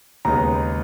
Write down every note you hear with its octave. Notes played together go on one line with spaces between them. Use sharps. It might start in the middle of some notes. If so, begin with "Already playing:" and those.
D#2 C#3 G#3 B3 D#4 A#5